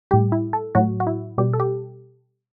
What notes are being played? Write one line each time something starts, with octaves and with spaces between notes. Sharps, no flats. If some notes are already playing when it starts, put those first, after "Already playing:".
A2 G3 G4
E4
A4
A2 F#3 F#4
F#4
E4
B2 G3 G4
A4
G4